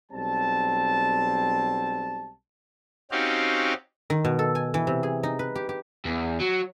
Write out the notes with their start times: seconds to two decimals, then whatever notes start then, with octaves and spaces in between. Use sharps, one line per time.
0.12 B1 G3 C4 A5
3.11 C4 C#4 D#4 F#4 G4 F5
4.10 D#3
4.25 B2
4.39 A4
4.55 G#5
4.74 E3
4.87 C3
5.03 G#4
5.23 D#4
5.39 B4
5.56 G4
5.69 G4
6.05 E2
6.40 F#3